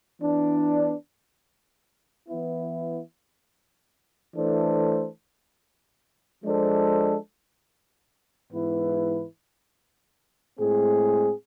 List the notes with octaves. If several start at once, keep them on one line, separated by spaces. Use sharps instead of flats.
E3 B3 D4
E3 B3 E4
E3 A3 D4 A4 C5
F3 G#3 D4 A4 C5
G#2 E3 B3 E4 B4
A2 G#3 C4 G#4